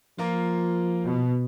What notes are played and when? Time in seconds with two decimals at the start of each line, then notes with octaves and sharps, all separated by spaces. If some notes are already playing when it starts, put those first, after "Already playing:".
0.18 F3 A#3 F4
1.04 B2